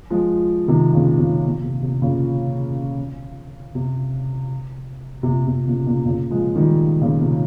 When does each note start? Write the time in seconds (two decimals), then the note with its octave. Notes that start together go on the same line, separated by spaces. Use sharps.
0.10 F3 G#3
0.68 C3 D#3
0.93 A#2 C#3
1.18 C3
1.45 A#2
1.63 C3
1.83 C3
2.02 A#2 C#3
3.75 C3
5.23 C3
5.28 A#2
5.47 C3
5.67 A#2 C#3
5.86 A#2 C#3
6.05 A#2 C#3
6.30 F3 G#3
6.56 D#3 G3
7.01 A#2 C#3
7.21 C3